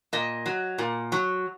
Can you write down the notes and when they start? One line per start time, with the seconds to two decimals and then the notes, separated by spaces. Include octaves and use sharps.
0.13 A#2 D#5
0.46 F#3
0.78 A#2
1.12 F#3